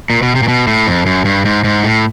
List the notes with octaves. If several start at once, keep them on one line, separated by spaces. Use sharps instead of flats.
A#2
B2
C3
A#2
B2
A2
F2
F#2
G2
G#2
G#2
A2